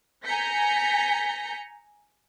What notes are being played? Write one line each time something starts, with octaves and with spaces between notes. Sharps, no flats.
G#5 A#5 G6 A#6 B6 C#7